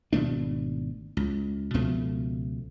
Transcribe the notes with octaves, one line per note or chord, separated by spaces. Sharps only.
G#1 B2 A3 D4
C#2
C#2 B2 F3 A3